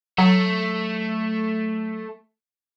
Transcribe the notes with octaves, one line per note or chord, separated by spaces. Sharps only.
F#3 A3